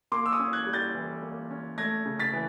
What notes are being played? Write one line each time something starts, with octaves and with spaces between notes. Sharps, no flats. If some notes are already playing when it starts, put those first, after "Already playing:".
A#3 C6 D6
E6
C#6 D#6
C#4
F#6 G#6
G3
G6 A6
E3
A#3
C#4
A3 G#6 A#6
C#3
A6 B6
E3